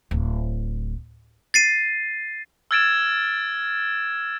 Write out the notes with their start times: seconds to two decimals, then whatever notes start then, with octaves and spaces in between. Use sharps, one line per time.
0.11 D1
1.54 A6 C7 D#7
2.71 E6 F6 G#6 A6 D7 E7